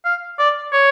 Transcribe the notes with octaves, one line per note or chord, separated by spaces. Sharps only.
F5
D5
C#5